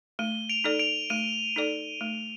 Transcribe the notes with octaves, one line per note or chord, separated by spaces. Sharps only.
A3 D#7 G7
D7 F7
D#4 A4 D5
D7 F7
A3 D#7 G7
D#4 A4 D5
A3